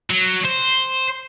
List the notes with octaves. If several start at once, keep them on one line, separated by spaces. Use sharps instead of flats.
F#3
C5